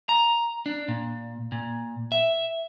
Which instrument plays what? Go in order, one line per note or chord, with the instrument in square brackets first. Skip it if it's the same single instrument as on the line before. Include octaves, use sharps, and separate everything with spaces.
[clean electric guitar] A#5
D4
A#2
A#2
E5